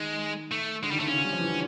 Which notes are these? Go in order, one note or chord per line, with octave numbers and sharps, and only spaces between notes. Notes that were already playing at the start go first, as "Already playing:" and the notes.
Already playing: D#3 G#3
A3
D3 G#3
D#3 G3
D3 A3
C#3 C#4
D3
G3
F3
E3
D3